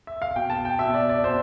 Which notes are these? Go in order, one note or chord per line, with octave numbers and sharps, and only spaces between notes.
E5
F5
B2 G5
A5
G5
B2 E5
D5
D5
B2 C5